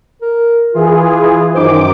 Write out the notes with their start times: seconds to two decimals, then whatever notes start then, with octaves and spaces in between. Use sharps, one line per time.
0.22 A#4
0.74 E3 F4 G#4
1.55 F#2 D#3 C5 D6